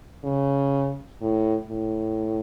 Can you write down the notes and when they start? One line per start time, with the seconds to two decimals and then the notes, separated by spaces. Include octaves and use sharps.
0.24 C#3
1.21 A2
1.70 A2